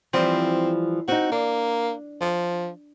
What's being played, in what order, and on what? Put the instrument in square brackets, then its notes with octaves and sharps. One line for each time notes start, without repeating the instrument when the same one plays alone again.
[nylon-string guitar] E3 F3 G3 [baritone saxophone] C4
[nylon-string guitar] C4 D#4 [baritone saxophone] F#4
[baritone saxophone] A#3 [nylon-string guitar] D4
[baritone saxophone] F3